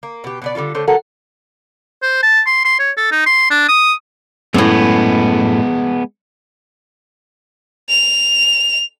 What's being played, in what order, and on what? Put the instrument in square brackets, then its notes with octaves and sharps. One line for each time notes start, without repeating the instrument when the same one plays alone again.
[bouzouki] A#3
B2 G4
B2 B3 D5
D3 G3 C#4 F4
D3 A3 C5 C#5
F#3 A4 A#4 F#5
[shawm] C5
A5
C6
C6
C#5
A4
D#4
C6
D4
D#6
[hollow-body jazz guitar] F#2 A2 [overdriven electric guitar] G#3 B3
[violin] F7